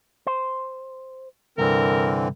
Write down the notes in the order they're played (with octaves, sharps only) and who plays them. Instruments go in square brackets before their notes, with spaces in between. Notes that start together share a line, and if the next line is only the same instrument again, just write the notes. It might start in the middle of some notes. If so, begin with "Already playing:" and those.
[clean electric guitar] C5
[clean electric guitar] C2 G2 [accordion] D3 E3 C4 [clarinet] A#4